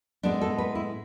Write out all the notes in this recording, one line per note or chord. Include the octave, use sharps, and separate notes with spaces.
A2 G#3 B3 D4
A4
B4
E4